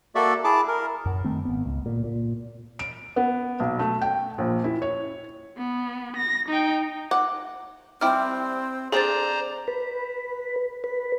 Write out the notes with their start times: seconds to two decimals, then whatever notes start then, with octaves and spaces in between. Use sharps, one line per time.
0.15 A#3 F#4 A4 D5 E5
0.44 E4 G#4 A5 D6
0.68 A#4
1.06 F#2
1.24 D#3 A3 C4
1.45 G#1 B3
1.66 C#2
1.86 A#2
2.04 A#2
2.79 D7
3.16 B3
3.60 B1
3.79 A3
4.02 G5
4.38 A#1
4.64 E4
4.82 C#5
5.57 B3
6.16 A#6
6.49 D#4 G5
7.11 F#5 D6
8.01 G3 C4 E4 G5 D6 F6
8.92 C4 D4 G#4 A4 C5 D5 A#5 A6
9.68 B4
10.84 B4